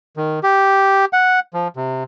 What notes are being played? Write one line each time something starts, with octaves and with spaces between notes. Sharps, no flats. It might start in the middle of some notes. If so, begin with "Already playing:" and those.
D#3
G4
F#5
F3
C3